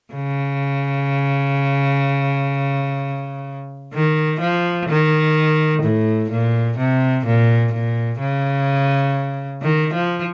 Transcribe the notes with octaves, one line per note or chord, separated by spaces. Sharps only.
C#3
D#3
F3
D#3
A2
A#2
C3
A#2
A#2
C#3
D#3
F3